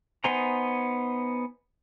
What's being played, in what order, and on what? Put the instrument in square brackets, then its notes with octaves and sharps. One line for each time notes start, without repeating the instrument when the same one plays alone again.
[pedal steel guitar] B3 D#4 C5 G#5 A#5